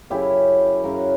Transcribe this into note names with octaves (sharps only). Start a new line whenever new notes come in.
F#2 C#3 F#3 C#4 E4 G4
F#2 C#3 F#3 C#4 F#4 A#4